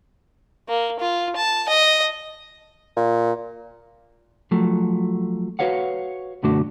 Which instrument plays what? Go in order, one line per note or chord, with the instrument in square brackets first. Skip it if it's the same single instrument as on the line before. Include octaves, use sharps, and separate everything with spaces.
[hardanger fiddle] A#3
F4
A5
D#5
[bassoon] A#2
[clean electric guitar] F3 F#3 A3
F#4 B4 C#5 F5 F#5
B1 F#2 D3 A3 D4 F#4